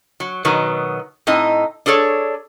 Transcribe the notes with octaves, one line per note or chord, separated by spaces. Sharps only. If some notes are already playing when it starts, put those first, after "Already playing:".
F#3
B2 D#3 F#3 B3
A2 C4 D#4 D#5
D4 G#4 A4 C#5